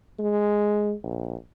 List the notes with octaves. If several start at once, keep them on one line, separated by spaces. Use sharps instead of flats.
G#3
A#1